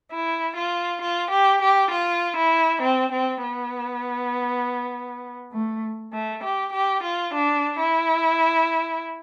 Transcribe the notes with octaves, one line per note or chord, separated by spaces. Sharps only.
E4
F4
F4
G4
G4
F4
E4
C4
C4
B3
A3
A3
G4
G4
F4
D4
E4